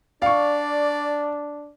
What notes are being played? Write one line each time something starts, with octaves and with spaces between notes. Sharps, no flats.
D4 D5 F5 C#6